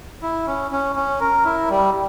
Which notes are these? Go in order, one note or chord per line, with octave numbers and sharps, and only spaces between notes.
E4
C#4
C#4
C#4
A#4
E4
G3